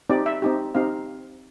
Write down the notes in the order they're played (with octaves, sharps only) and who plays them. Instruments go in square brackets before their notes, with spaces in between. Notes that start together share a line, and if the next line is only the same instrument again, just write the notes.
[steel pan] C4 D#4 G4 D5
E5
C4 D#4 G4
C4 D#4 G4 F5